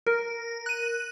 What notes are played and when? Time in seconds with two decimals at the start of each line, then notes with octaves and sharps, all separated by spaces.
0.07 A#4
0.66 F#6 D#7